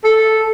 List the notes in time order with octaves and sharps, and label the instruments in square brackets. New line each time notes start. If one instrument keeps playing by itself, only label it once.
[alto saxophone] A4